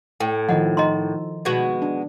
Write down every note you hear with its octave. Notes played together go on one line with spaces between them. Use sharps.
A2 G5
D#3 F3 E4 D#5 F#5
D#4 D#5 A#5 C6
B2 G#3 F#4
D4